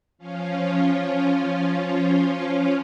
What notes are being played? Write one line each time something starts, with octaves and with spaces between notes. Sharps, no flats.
F3 C#4 F4